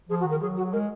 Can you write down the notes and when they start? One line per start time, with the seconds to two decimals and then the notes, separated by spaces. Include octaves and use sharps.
0.09 F3 G#4
0.20 F#4
0.25 D#3
0.30 A#4
0.41 F#3 G#4
0.57 F#4
0.73 G#3 A#4